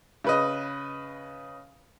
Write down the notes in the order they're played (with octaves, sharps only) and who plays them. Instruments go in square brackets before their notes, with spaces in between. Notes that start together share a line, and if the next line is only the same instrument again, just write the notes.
[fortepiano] C#3 B4 D#5